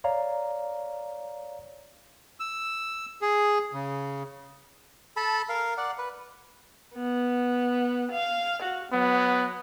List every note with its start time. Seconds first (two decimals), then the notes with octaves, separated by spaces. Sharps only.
0.04 C#5 D5 F5 A#5
2.40 E6
3.22 G#4
3.73 C#3
5.17 A4 A5 B5
5.49 A#4 F5
5.77 D5 F#5
5.98 B4
6.95 B3
8.12 F5
8.62 F#4
8.92 F#3 B3